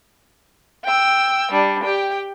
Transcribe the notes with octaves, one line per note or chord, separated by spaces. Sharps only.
G5 E6
G3 D4
G4 G5